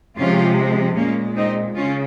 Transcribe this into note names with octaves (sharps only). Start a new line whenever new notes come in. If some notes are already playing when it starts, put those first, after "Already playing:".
C3 F3 G#3 C#4 F4
A#2 G#3 A#3 C#4
C4 D#4
C#3 C#4 F4